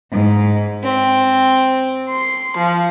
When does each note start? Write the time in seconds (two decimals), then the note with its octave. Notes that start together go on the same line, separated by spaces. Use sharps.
0.11 G#2
0.84 C4
2.09 C6
2.57 F3